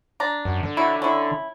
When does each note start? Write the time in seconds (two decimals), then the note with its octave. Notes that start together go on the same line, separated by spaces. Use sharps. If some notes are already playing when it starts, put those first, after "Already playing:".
0.20 D4 A#5
0.45 F#2
0.63 D3
0.77 F#3 E4
1.02 C#4 E4